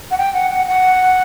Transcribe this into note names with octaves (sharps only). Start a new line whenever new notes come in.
F#5
G5
F#5
F#5
F#5